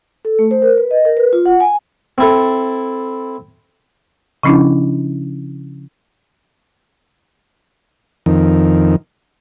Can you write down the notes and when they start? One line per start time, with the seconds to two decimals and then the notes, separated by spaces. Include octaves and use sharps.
0.25 A4
0.39 A3
0.51 C5
0.62 A#4
0.78 B4
0.91 D#5
1.05 A#4
1.17 B4
1.33 F4
1.46 F#5
1.60 G#5
2.18 C4 E4 A4
4.43 C#3 F3 C#4 D4 E4
8.26 F2 D#3